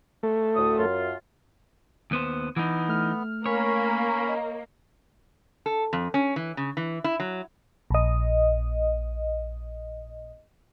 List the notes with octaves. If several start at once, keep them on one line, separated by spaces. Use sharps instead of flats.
A3
D2 A2 D#6
F#2 F4
D#2 B3 C5
E3 B3 D#4
A3 F6
A#3 C#4 C#5 B5
D#5
A4
F2
C#4
E3
C#3
E3
E4
F#3
A#1 D#5